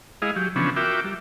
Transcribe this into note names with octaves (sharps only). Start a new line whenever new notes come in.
G#3 E4 G#4 D#5 F5
F#3 G4
C#3 E3 F3 B3 C#4 D4
F4 F#4 A#4 E5 G5 D6
G3